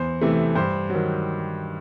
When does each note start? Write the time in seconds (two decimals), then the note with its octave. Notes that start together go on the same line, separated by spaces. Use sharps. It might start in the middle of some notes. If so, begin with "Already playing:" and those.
Already playing: E2 C5
0.21 C3 E3 A3
0.55 G2 C5
0.90 F#3
0.95 D#3